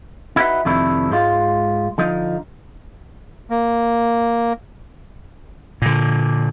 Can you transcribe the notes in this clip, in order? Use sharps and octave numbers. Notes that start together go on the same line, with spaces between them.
D#4 E4 F#4 A4 B4 E5
F2 C3 D#3 A3 D4 E4
G#2 G#3 F4
D3 F3 D#4
A#3
A#2 D3